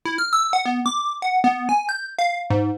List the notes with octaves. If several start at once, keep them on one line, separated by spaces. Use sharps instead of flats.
E4
F6
E6
F#5
B3
D6
F#5
B3
G#5
G6
F5
G#2